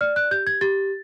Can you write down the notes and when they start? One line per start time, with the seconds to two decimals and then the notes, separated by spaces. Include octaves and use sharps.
0.01 D5 F6
0.16 F#6
0.31 G4 G6
0.47 G#6
0.61 G4 A6